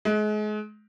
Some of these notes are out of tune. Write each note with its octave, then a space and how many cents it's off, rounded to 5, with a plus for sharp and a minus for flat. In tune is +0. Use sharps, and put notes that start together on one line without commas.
G#3 +35